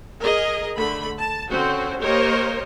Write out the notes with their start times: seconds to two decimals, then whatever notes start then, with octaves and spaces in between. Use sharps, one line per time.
0.21 G#4 A#4 D#5
0.77 D3 A3 B5
1.19 A5
1.50 D3 C4 C#4 F#4 C5
2.02 A#3 G4 A#4 C5 C#5 D#5